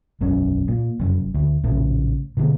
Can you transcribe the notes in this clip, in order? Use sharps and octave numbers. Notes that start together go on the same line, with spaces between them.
E1 B1 F#2 C#4
A#2
F1 F#2
D2
A#1 A2 C#3
B2 D3 A#3